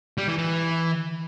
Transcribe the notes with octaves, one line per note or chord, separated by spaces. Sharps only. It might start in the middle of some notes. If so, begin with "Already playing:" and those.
G3
E3
E3